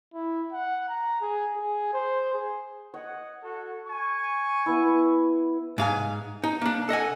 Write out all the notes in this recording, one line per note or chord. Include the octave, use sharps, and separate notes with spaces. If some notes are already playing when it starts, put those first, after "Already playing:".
E4
F#5
A#5
G#4
G#4
C5
G#4
C#5 D#5 F#5
F#4 A4
G#5 C#6
B3 E4
G#2 F5 G#5
D#4
A#3 D4
A4 D#5 F#5 G#5